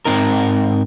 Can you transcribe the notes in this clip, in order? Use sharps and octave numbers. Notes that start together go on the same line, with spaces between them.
G#2 C4 D#4 A#4